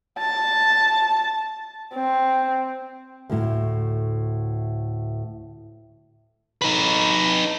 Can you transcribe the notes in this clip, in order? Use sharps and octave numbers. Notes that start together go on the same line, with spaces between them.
A5
C4
D2 A2
D#4 B4